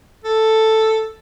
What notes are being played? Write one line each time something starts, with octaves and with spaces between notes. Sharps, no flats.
A4